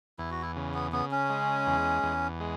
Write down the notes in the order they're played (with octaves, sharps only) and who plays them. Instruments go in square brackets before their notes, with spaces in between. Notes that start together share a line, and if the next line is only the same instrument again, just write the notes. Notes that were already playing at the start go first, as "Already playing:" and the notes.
[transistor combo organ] E2 [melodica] E4
[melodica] F#4
E4
[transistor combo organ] C#3
[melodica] B3
[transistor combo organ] C#3 [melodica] B3
[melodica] C#4
[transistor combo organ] G#3
E2
E2
G#3